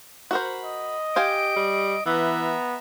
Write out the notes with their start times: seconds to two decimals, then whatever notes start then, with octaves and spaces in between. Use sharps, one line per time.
0.31 F#4 A#4 C5 B5
0.64 D#5
1.16 G4 C5 F5 G#5 D7
1.56 G3
2.06 E3 B3 E5 A#5